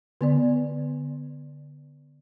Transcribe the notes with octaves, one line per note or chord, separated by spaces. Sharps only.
D3 B3 D5